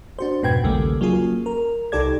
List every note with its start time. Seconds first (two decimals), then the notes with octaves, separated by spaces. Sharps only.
0.19 D4 F#4 C5
0.42 F2 G#2 B2 B4 G5 G#6
0.63 A#1 D#2 C#3 G3 A3 A#3
1.01 F#3 A#3 C#4 F4 G#4
1.46 A#4
1.92 C2 D#4 G4 A4 D5 G#6